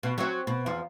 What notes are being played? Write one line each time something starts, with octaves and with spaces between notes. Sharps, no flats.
B2
F#3 C4
B2
E2 F3